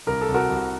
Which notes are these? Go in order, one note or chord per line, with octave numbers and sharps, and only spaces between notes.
C2 A#4
A4
C2
F#4 A#4
C2